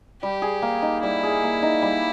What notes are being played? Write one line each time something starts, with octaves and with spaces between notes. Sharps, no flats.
G3 G4
G#4
A#3
D#4
G3 E4
G#4
A#3
D#4
G3